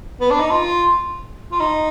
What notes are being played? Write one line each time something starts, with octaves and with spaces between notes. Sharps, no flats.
B3
D4
D#4
F4
F4
D#4